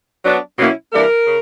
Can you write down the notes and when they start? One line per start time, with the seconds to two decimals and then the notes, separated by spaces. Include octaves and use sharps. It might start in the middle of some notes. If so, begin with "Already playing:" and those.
0.25 F#3 B3 D4
0.58 B2 F#3 A#3 C#4 E4
0.92 E3 G3 A#3 D4 A#4
1.26 C#3